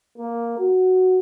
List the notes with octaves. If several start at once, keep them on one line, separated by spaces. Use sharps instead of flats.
A#3
F#4